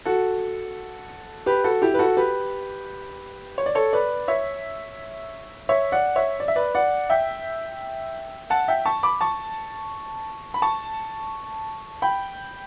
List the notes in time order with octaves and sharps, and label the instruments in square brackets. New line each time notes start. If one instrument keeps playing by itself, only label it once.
[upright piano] F#4 A4
G4 B4
F#4 A4
E4 G4
B4
F#4 A4
G4 B4
C#5
D5
A4 C#5
B4 D5
C#5 E5
C#5 E5
D5 F#5
C#5 E5
D5
E5
B4 D5
D5 F#5
E5 G5
F#5 A5
E5 G5
A5 C#6
B5 D6
A5 C#6
B5
A5 C#6
G5 B5